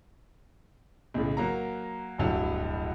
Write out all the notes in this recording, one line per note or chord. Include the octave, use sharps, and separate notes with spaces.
B1 A2 C#3 E3
F#3 A#3 A#5
D1 B1 G2 F#3 E4